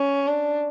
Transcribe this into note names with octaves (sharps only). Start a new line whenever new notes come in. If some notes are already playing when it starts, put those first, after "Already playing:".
Already playing: C#4
D4